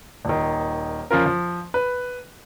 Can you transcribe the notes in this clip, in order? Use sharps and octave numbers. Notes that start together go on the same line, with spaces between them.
D#1 D#3
F3 C#4 F4 A#4
F3
B4